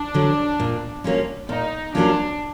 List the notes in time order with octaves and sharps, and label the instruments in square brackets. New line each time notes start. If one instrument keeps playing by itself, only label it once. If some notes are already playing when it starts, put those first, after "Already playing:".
Already playing: [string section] D4
[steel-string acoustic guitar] D3 F#3
A#2
F#3 A#3 C#4 F4
[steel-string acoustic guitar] A#2 [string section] D#4
[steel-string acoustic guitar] F#3 A#3 C#4 F4 [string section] D4